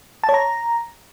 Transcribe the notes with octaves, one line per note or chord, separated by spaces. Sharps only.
A5
C#5
A#5